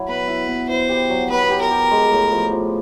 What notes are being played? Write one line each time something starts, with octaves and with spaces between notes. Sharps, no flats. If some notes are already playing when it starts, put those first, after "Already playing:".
Already playing: F#3 E4
B3 B4
E4
B3
E4 C5
G4
F#3
B3 B4
G4
A#4
G4
G#3
A2
F3
F3